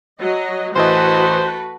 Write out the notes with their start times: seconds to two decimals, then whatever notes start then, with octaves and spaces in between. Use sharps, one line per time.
0.19 F#3 D#5
0.75 A1 E3 A3 F#4 B4 C5 D#5